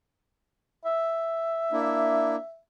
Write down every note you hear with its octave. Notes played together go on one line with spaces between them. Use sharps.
E5
A#3 D4 E4